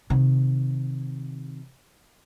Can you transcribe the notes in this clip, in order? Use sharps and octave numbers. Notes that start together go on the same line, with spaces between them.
C3 D#3